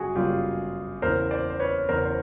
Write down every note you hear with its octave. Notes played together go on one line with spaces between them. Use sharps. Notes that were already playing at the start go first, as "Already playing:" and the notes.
Already playing: G1 F#2 C#3 F#4 G#4
G1 F#2 C#3 F4 G4
E2 C#3 E3 A#4 C5
C5 D5
C5
B4 C#5
E2 C#3 E3 A#4 C5
C5